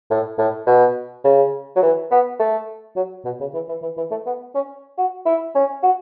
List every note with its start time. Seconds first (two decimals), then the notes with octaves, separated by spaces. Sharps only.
0.10 A2
0.38 A2
0.67 B2
1.24 C#3
1.76 F#3
1.82 E3
2.11 B3
2.39 A3
2.96 F#3
3.25 B2
3.40 C#3
3.54 E3
3.69 E3
3.82 E3
3.97 E3
4.11 A3
4.26 B3
4.55 C#4
4.98 F#4
5.26 E4
5.55 C#4
5.83 F#4